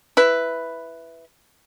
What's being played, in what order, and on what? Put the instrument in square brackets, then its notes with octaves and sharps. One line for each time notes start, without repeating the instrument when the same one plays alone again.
[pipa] E4 B4